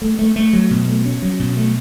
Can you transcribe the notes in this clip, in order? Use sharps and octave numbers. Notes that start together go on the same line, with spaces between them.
A3
A3
A3
F#3
B2
A3
C#4
F#3
B2
A3